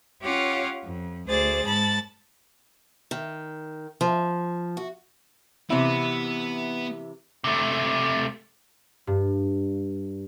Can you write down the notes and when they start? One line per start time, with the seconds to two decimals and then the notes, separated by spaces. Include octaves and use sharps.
0.22 C#4 F4 G4 C#5 F5 F#5
0.83 F2
1.27 D2 G#4 C5 D5 A6
1.65 G#2 A5 B5 A6
3.11 D#3
4.01 F3
4.77 F#4
5.70 C3 E3 B3 E4
7.44 C3 A3
9.07 G2